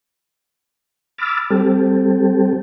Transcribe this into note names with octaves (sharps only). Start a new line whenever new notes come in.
B5 D6 E6 F6 A6
G3 C4 G4 A4